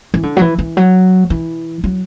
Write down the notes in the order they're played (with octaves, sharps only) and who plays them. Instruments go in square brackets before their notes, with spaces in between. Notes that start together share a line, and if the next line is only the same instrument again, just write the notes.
[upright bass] E3
D3
F#3
E3
E3
F#3
E3
F#3